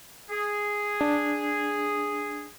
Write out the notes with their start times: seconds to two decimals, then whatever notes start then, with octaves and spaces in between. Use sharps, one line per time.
0.29 G#4
1.01 D4